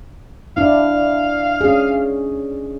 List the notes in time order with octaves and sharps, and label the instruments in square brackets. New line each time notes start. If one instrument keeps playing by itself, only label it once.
[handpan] D4 E4 [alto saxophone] F5
[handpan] C#4 G#4